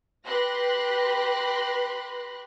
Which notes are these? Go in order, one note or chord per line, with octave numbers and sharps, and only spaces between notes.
G4 B4 B5 C6 F#6 A#6